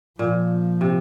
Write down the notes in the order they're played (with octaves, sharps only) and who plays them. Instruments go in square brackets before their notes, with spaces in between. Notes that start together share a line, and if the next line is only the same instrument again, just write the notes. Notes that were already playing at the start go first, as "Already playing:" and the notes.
[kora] A#2 [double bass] F3
[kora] C3